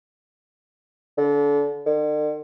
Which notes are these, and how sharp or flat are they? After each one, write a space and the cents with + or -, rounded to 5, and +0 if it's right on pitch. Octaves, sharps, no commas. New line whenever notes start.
D3 -30
D3 +45